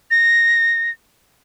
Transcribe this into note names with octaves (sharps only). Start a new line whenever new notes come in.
A#6